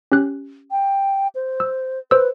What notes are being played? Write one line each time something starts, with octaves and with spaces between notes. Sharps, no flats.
C#4 G4 F#6
G5
C5
E6
B4 C5 E6